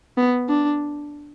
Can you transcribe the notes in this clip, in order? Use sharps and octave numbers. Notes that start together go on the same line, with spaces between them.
B3
D4